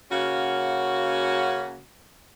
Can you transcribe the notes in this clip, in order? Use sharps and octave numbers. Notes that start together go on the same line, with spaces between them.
C#3 A#3 C#4 F#4